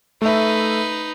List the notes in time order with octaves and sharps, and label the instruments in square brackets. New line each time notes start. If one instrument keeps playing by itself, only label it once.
[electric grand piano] A3 E5 [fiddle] D#4 B4